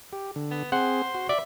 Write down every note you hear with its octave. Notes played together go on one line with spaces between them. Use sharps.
G4
D3
B3
C4 G#4 C5 F#5
F#4
D5 E5